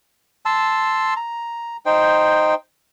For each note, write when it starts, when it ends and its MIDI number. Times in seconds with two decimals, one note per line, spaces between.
0.46 1.14 81
0.46 1.14 84
0.46 1.14 88
1.16 1.77 82
1.86 2.54 63
1.86 2.54 72
1.86 2.54 79